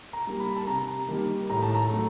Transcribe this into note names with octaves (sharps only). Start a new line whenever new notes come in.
A#5
G3 A#3
B5
A5
C3 A#5
D#3 G3 A#3
A2 A#5
A5
A#5
F#3 A3